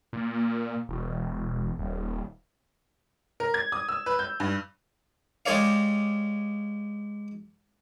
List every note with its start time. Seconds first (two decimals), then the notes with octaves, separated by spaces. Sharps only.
0.13 A#2
0.89 E1
1.78 D#1
3.40 A#4
3.54 G#6
3.72 D#6
3.89 E6
4.06 B4
4.19 G6
4.40 G2
5.46 G#3 G4 G#4 C#5 D5 F5